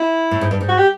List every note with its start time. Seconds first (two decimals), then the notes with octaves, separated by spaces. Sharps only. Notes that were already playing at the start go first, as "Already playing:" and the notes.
Already playing: E4
0.31 A2
0.41 G#2
0.51 G2
0.61 G#2
0.69 F#4
0.78 G4